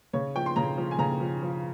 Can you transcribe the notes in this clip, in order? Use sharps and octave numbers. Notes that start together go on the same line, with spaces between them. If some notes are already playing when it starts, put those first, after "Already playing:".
C#3 C#5
F3 G5
C6
C#3 A#5
F3
G#5
C#3 A#5
F3
F3